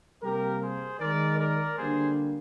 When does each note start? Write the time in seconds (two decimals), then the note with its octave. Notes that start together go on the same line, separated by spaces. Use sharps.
0.22 C3 G3 A#3 G4 A#4
0.61 G#4 C5
0.99 D#3 G#3 A#4 D5
1.38 A#4 D5
1.77 D3 G3 A#3 G#4 C5